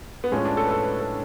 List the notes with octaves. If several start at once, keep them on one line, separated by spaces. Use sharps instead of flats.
B3
A2 F3 G#3 C#4
D4
A4
B4
A4
B4
A4